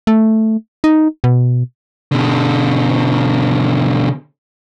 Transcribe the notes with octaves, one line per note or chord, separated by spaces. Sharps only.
A3
D#4
B2
B2 D3